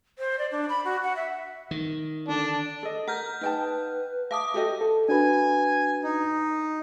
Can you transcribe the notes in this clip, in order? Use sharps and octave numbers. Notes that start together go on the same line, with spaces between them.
C5
D5
D4
B5
F#4
F#5
E5
D#3
D3 D4
A4 D#5
A#4 F#5 F6 G6
D#4 B4 G5 A5
E5 F5 A5 D6 D#6
F#4 G4 A4 D#5
A4
D4 F#4 B4 G#5
D#4